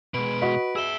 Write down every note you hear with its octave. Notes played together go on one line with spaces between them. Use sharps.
B2 G#3 B4 D7
F#4 D#5 B6
G#4 E5 E6 E7 G7